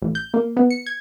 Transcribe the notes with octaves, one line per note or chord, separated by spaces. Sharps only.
A1
G6
A#3
B3
C#7
G#6